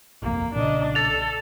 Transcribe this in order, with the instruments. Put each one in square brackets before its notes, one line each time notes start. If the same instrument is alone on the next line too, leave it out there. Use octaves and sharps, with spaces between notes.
[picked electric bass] G1 C2 F2 [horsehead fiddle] A#3
[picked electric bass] B1 A#2 C#3 [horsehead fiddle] D4 D#5
[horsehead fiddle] A4 [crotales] A6 F7